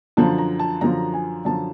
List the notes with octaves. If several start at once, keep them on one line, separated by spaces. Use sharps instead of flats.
F#2 D3 F3 A5
A#5
A5
F#2 D3 F3 A#5
G#5
F#2 D3 F3 A5